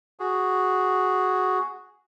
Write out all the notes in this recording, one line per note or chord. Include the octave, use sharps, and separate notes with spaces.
F#4 G#4